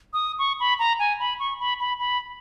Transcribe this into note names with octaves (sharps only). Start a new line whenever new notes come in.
D#6
C#6
B5
A#5
G#5
B5
C#6
B5
B5
B5